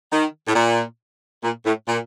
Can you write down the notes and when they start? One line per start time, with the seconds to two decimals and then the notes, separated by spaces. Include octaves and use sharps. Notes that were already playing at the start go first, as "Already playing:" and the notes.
0.12 D#3
0.48 A2
0.56 A#2
1.44 A#2
1.66 A2
1.88 A#2